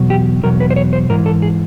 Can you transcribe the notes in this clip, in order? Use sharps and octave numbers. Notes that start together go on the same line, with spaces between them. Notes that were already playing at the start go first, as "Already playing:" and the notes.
Already playing: E2 B2 F#3
G4
E2 B2 F#3 A#4
B4
C5
C#5
C5
G#2 E3 A#4
A4
G#4